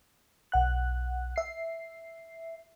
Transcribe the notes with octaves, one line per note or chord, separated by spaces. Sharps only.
B1 F#5 F#6
E5 C7